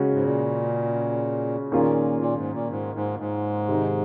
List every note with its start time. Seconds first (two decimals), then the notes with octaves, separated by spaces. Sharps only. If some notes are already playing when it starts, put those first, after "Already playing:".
Already playing: C#3 G#3 C#4 F#4
0.13 G#2
0.23 A#2
1.71 A#2 D#3 A#3 C#4 F4 G#4
2.20 A#2
2.37 G#2
2.53 A#2
2.70 G#2
2.95 G#2
3.19 G#2
3.68 C3 D#3 G#3 D#4